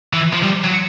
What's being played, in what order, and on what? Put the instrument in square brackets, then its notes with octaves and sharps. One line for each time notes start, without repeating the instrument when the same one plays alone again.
[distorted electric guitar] E3
F3
G3
F#3